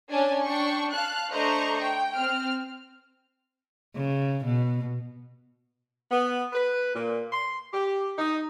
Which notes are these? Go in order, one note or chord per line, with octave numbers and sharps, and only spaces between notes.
C#4 D4 G#5 A5
D4 G5 C#6
F5 A5 F#6
A3 D4 C5 D#5 A#5 C#6
G5
C4 F6
C#3
B2
B3
B4
A#2
C6
G4
D#4